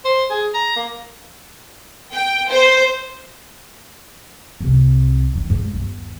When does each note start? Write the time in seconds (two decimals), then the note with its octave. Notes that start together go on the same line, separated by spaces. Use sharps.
0.05 C5
0.30 G#4
0.54 A#5
0.76 A#3
2.12 G5
2.50 C5
4.60 C2 C3
5.35 D#3
5.50 G#2
5.73 G1 D#2